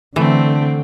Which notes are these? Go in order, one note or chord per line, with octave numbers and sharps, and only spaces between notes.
D3 E3 A3 C4